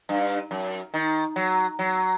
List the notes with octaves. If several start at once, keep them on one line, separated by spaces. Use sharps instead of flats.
G2
F#2
D#3
F#3
F#3